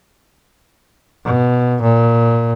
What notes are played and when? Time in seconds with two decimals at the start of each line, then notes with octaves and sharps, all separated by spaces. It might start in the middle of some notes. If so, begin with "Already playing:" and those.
1.24 B2
1.82 A#2